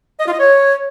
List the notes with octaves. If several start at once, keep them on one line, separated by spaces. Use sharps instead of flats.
D#5
F4
D#5
C#5